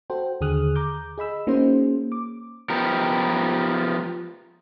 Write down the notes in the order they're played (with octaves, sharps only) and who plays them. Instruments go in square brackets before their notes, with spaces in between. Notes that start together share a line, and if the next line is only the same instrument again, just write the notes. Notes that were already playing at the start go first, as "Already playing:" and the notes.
[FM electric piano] F#4 A4 C5 G5
D#2 D3 G#4 D#6 F6 F#6
A#5 D6 G6
G#4 D#5 B5 E6
A#3 C#4 D#4 F#4 G#4 C5
D6
[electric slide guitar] F3 B3 G4 A#4